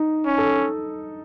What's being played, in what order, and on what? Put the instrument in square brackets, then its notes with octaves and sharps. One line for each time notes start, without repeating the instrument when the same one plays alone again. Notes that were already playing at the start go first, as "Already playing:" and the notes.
Already playing: [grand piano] D#4
[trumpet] C#4
[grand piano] A4